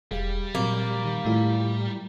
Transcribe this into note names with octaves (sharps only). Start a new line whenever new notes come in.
E1 G3 G#4 F5
A#2 F3 F#3 A#3 C4
D#3
A2 A3 E4 F4